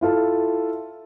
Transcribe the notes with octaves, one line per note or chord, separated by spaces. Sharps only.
E4 F4 A4